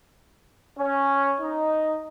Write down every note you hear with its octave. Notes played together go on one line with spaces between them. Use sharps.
C#4
D#4